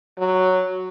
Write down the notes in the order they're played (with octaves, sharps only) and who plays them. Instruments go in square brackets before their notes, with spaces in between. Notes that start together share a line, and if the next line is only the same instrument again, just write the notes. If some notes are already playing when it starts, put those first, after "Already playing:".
[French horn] F#3